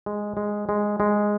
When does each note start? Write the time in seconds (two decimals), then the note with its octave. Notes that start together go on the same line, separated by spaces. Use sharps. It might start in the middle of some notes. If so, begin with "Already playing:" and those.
0.06 G#3
0.37 G#3
0.69 G#3
1.00 G#3